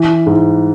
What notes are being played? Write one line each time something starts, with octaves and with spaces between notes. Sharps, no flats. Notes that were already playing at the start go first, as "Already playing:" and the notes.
Already playing: E3
G#2